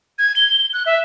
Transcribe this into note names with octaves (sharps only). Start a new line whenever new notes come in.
G#6
G7
F#6
E5